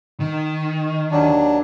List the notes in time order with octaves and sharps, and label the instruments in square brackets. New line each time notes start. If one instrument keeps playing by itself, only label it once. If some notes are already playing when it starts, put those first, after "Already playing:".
[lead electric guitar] D#3
[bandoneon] D#2 F#3 D4